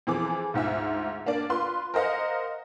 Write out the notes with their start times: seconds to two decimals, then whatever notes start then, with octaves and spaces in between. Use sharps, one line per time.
0.07 F2 E3 G#4 D6
0.54 D2 G#2 F4 E5
1.26 A#3 D4 D5
1.50 F4 B4 C6
1.94 A#4 C5 D#5 F5 F#5